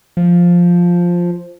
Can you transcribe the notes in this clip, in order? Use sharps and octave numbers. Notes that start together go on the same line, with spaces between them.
F3